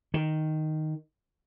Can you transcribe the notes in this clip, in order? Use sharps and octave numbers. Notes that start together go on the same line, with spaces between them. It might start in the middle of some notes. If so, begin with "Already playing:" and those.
D#3